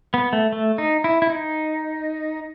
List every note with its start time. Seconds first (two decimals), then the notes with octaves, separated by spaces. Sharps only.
0.14 B3
0.33 A3
0.52 A3
0.78 D#4
1.04 E4
1.22 E4
1.30 D#4